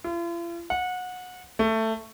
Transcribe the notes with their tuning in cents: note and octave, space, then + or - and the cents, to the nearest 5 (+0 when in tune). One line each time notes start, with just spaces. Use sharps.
F4 -45
F#5 -25
A3 +15